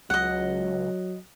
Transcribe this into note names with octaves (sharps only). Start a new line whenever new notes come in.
C#2 F#3 D#5 F#5